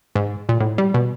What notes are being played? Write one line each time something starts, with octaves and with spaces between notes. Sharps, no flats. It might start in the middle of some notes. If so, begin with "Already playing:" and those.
G#2
A#2
A2
G3
B2